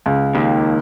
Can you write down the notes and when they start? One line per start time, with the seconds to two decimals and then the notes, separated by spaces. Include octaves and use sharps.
0.06 C#2
0.35 D#2